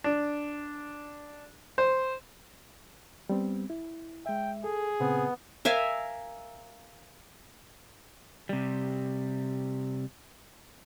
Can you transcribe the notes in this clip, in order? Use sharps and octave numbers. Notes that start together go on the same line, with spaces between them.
D4
C5
G3 B3 C4
E4
G#3 E5 G5
G#4 A4
A#2 C#3 B3 C4
A#4 E5 F5 G#5
C3 G3